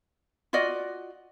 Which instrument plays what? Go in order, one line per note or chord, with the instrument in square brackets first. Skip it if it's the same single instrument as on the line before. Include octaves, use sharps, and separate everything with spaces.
[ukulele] F4 F#4 D5 D#5